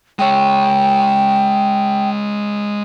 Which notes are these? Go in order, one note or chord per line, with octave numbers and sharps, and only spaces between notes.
G#3 C#5 G5